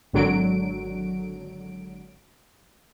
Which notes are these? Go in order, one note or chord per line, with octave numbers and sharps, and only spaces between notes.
G#1 D3 F#3 D7